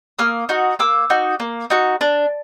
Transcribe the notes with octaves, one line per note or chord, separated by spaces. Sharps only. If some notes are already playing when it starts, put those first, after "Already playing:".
A#3 D#6 F6
D#4 F#4
A#3 D6 E6
D#4 F#4
A#3
D#4 F#4
D4